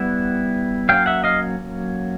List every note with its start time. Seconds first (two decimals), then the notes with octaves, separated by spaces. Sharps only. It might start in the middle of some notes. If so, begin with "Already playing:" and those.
Already playing: G3 B3 E4 E5 F#5
0.89 F#3 A#3 C#4 F5 G5
1.06 E5 F#5
1.24 D#5 F5